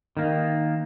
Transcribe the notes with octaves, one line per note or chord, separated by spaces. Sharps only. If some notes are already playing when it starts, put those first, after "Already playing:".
D#3 A#3